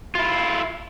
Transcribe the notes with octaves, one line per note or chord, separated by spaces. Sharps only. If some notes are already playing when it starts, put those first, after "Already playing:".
E4 F4